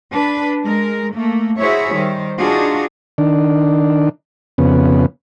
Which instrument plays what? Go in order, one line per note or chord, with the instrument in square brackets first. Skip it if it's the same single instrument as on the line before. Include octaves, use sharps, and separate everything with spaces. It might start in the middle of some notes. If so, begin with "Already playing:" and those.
[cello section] D4 B4
G#3 A#4
A3 A#3
E4 F#4 G#4 C5 C#5 E5
D#3 G3 C5
D4 D#4 F4 F#4 G#4
[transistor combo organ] D#3 D4
F2 C#3 B3